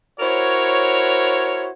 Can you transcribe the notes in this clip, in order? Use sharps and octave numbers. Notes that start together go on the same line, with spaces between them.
E4 F#4 A#4 C5 C#5